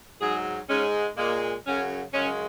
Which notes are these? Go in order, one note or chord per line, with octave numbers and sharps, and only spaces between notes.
G#2 F#3 G#4
G#2 G#3 C#4
A#2 G#3 A#3
F#2 C#3 F#3 C#4
F#2 C#3 G#3 C#4